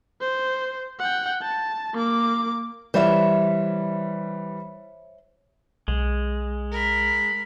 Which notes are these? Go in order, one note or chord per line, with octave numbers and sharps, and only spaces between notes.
C5
F#5 G5
A5
A#3 D6
E3 G3 C5 C#5 E5
B1 G#3
A#4 B5